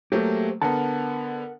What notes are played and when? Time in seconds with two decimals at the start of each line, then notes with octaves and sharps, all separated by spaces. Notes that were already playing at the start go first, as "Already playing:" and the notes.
0.12 F#3 A3 A#3 G4 C5
0.62 D3 B3 A#4 F#5 A5